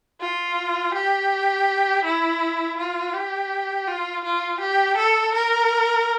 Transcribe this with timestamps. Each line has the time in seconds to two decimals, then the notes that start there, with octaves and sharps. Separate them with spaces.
0.21 F4
0.94 G4
2.04 E4
2.78 F4
3.14 G4
3.87 F4
4.24 F4
4.60 G4
4.97 A4
5.34 A#4